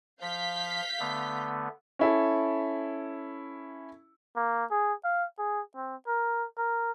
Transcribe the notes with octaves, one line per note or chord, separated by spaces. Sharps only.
F3 F5 G6 B6
D3 A3 B3
C#4 E4 A4
A#3
G#4
F5
G#4
C4
A#4
A#4